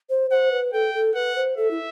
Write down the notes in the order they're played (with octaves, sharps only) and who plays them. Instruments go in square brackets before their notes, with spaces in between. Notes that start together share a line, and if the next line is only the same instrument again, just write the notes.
[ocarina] C5
[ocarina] C5 [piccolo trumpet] F#5
[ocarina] B4
[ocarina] A4 [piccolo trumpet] G5
[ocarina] A4
[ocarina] B4 [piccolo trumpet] F#5
[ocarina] C5
[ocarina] A4 [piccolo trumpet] E5
[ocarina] E4